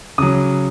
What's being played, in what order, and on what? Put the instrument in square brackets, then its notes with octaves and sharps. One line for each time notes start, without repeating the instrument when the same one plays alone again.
[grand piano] C#3 F#3 D#6